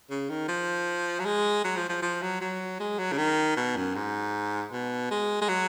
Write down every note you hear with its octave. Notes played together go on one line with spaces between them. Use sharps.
C#3
D#3
F3
F#3
G#3
F#3
F3
F3
F3
F#3
F#3
G#3
F#3
C#3
D#3
B2
F#2
G#2
B2
G#3
G#3
F#3